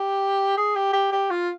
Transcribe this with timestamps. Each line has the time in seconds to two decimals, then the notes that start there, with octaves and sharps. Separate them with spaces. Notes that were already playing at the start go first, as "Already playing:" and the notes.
Already playing: G4
0.57 G#4
0.75 G4
0.93 G4
1.12 G4
1.30 F4